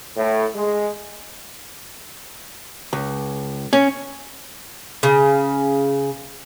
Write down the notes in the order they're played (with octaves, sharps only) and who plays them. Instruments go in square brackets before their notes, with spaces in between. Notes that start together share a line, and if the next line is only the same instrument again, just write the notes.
[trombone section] A2
G#3
[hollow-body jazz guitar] C#2
C#4
[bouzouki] C#3